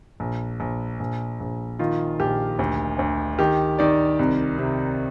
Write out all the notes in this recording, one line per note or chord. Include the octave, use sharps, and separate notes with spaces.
A#1
A#1
A#1
A#1
D#3 F4
A#1 G4
D2
D2
D#3 G4
D#3 D5
C2
C3